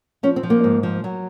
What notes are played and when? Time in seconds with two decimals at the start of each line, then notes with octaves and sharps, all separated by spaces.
0.23 F3 C#4
0.36 C4
0.43 F3
0.50 A#3
0.64 G#2
0.83 F3
1.04 F#3